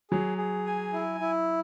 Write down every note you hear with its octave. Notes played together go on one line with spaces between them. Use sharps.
F#3 G#4
G#4
G#5
E4
E4